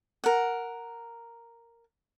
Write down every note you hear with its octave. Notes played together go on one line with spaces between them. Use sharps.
A#4 F#5